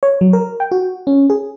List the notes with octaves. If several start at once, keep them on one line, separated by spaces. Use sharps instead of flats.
C#5
F#3
A#4
G5
F#4
C#4
G#4